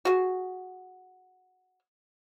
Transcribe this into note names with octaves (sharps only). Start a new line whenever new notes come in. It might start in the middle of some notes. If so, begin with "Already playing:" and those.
F#4 G#4